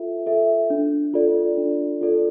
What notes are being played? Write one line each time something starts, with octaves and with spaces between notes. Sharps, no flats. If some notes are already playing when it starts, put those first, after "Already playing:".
Already playing: F4 A4 E5
A4 E5
D4
F4 A4 D5
D4
F4 A4 D5